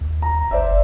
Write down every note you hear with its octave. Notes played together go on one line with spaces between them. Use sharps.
D#2
A#5
F#1 C5 D5 E5